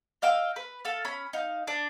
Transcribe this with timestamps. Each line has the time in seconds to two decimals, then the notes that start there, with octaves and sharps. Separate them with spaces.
0.22 D#5 F5 G5 E6
0.56 B4
0.85 A4 F5
1.05 C#4 B5
1.33 D#4 F5
1.68 D4